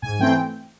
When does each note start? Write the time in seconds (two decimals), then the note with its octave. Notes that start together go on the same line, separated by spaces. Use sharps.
0.02 G#2 G#5
0.19 E3 A3 C4 G5